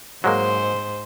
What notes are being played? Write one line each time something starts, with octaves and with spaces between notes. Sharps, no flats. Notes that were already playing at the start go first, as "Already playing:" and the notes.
G#2 F#3 G#3 A#3 C5